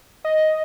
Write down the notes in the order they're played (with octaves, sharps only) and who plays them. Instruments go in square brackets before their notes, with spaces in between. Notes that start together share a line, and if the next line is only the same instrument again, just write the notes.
[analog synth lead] D#5